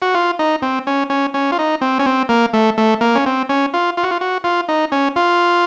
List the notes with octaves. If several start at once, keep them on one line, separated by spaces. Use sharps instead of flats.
F#4
F4
D#4
C4
C#4
C#4
C#4
F4
D#4
C4
C#4
C4
A#3
A3
A3
A#3
C#4
C4
C#4
F4
F4
F#4
F4
F#4
F4
D#4
C#4
F4